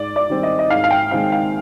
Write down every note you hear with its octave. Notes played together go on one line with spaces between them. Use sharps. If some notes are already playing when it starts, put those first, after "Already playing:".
Already playing: G#2 D5
D5
D#3 G3 C4
D#5
D#5
G#2 F5
F5
G5
D#3 G#3 C4 D#4 F5
F5